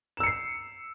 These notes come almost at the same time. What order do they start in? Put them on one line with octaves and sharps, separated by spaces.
E7 E6 C#7 C7